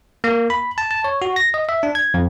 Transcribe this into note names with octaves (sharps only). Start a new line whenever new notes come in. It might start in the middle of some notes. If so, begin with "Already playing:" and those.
A#3
B5
A5
A5
C#5
F#4
A#6
D#5
E5
D4
G#6
F2